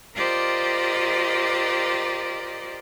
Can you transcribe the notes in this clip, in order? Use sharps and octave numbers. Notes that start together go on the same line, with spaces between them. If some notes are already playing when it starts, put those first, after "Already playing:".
F4 G4 A#4 C5 D5 D#5